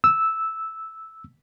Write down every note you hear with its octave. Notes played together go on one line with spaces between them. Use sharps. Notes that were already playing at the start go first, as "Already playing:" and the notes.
E6